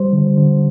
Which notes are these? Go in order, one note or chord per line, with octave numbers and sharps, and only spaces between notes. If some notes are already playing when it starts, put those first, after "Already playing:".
Already playing: G3 C5
D3
D3